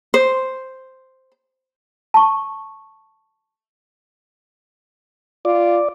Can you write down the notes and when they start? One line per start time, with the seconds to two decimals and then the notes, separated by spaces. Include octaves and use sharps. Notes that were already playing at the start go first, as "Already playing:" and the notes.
0.14 C5
2.14 A5 C#6
5.45 F4 D5